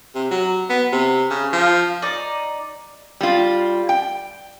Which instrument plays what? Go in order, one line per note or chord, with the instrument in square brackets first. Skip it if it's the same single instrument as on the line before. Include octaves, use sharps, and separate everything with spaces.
[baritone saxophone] C3
F#3
B3
C3
C#3
F3
[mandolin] D#4 D5
[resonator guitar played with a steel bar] G3 F4
G5